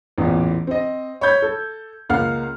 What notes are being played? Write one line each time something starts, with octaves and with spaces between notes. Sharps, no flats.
A1 E2 A#2 E3
C4 D#5
C#5 B5 G6 G#6
A4
C#2 A#3 F5 F#5 F6